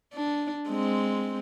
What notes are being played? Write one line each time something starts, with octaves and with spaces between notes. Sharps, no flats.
D4
G#3 C4